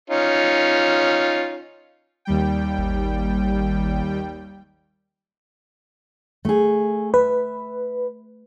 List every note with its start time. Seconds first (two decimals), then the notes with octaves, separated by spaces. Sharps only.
0.10 C#4 D#4 F4
2.25 D#2 G3 G5
2.78 G#1
6.45 A3 G#4
7.14 B4 E5